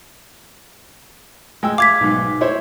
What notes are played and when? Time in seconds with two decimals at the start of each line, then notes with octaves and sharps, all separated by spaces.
1.63 G#3 G5 E6
1.78 F5 D6 G#6 B6
2.01 B1 G#2
2.41 E4 C5 C#5